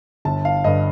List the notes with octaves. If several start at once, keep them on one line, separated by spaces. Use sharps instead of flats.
G1 A5
F5
G2 D3 D#5